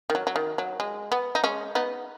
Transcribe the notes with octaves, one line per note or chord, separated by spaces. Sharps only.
D#3
F#3
F#3
D#3
F#3
G#3
B3
D#4
G#3 C#4
B3 D#4